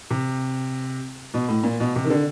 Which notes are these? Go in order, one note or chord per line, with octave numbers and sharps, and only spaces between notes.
C3
B2
A2
A#2
B2
C3
D#3
D3